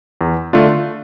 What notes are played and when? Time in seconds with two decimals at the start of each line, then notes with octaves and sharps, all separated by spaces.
0.21 E2
0.53 D3 A3 D4 F4